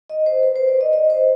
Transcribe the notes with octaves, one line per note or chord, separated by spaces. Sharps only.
D#5
C5
B4
C5
D5
D#5
D#5
C5